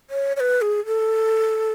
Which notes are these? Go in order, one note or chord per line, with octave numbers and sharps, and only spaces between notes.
C#5
C#5
B4
G#4
A4